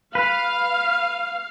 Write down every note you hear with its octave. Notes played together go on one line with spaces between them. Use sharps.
B4 F5